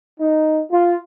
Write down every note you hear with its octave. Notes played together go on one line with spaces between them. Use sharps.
D#4
F4